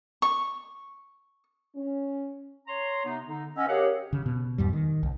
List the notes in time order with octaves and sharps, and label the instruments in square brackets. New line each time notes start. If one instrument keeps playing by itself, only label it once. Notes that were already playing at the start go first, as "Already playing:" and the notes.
[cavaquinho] C#6
[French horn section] C#4
[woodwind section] C#5 A#5 C6
C3 B3 D#4
D3 D#4
[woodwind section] C#4 [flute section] D#5 F#5 E6
[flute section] G4 A#4 C#5 [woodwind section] G#4 F5 F#5
[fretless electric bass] C#3
B2
E2 G#2 G3
D#3
C2